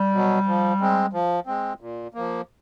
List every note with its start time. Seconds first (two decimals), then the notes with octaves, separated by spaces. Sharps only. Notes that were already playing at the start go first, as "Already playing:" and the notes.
Already playing: G3
0.12 B2 F#3
0.46 F3
0.80 G#3 C4
1.13 F3
1.47 G#3 C4
1.81 A#2
2.14 F3 A#3